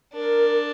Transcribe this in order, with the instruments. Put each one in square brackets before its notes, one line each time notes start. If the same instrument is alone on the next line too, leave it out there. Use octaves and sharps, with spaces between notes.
[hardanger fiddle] D4 [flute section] A#4